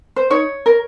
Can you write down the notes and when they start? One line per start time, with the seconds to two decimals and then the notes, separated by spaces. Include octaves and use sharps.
0.16 C5
0.30 D#4 C#5
0.66 A#4